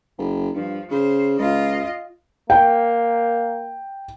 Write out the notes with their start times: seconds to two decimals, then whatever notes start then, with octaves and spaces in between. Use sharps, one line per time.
0.18 F#1
0.55 G2 F3
0.91 C#3 C5
1.38 C#2 F4 D#5
2.50 A#3 G5